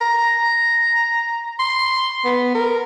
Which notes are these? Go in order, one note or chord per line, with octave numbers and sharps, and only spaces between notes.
A#5
C6
B3
A#4